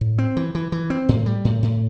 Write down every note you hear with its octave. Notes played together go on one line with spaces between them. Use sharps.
A2
C4
E3
E3
E3
C4
A2
G3
A2
A2